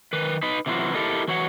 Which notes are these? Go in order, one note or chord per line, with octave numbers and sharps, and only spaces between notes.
D#3 B4
D#4 B4
C3 E3 F#3 G#3 F4 F#4
E4 G4 A4 A#4 D#5
E3 F#4 C#5 F#5